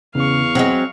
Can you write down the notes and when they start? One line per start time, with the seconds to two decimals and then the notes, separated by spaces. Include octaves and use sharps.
0.15 E2 C#3 F5 C#6
0.55 F#3 G#3 C4